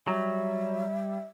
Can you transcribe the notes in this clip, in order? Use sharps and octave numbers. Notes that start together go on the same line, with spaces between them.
F#3 G3 E5